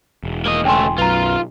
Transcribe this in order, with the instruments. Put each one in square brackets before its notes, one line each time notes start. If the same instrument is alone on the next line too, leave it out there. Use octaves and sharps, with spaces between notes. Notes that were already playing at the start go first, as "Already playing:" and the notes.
[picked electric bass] E1
[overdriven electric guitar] A#3 D#5
[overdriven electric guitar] C#2 A3 [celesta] G5 G#5 C6
[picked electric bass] B1 F#2 [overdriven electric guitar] F4 [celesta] B4 A#5